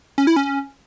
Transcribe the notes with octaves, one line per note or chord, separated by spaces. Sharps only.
C#4
E4
C#4